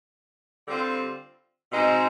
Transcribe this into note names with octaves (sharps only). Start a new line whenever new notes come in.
D3 G3 C4 F4
B2 G#3 C4 D#4